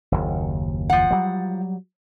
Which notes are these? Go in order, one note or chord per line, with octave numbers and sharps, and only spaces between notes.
F#1 D#2
F3 F#5
F#3 G3